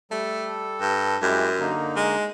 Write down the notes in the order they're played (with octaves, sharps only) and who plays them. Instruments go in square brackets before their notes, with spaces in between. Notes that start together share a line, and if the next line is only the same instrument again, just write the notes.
[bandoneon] G3 A4 [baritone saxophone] A3
[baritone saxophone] G2
[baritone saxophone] F#2 [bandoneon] G#3 E4 G4
[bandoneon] D3 A#3 D#4
[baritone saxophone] G#3